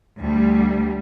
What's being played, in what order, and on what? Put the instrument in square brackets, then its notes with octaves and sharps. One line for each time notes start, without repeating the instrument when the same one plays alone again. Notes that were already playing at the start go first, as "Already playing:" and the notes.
[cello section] D2 G3